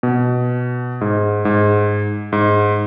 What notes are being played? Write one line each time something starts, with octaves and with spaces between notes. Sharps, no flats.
B2
G#2
G#2
G#2